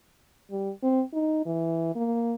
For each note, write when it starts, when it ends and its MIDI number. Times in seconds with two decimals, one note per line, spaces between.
0.51 0.71 55
0.83 1.02 60
1.14 1.44 63
1.46 1.93 52
1.96 2.35 58